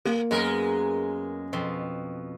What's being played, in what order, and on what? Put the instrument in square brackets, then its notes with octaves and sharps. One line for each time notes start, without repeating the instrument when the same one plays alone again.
[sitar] A3 [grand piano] A#3
[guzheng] F#2 B3 [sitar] G#3 A#4
[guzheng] F2 B2 C6